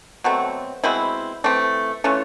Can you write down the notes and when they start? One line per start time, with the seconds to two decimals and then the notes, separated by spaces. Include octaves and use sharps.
0.24 B2 F#3 A3 C4
0.84 B2 G#3 C4 E4
1.44 E3 A3 C4
2.04 E3 A3 C#4 F4